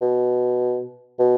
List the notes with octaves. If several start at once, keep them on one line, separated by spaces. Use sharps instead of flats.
B2
B2